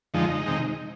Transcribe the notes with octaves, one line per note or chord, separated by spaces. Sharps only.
F2 D3 F3 G#3 D#4
C3 D#3 G#3